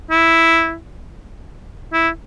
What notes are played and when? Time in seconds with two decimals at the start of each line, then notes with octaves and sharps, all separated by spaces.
0.11 E4
1.93 E4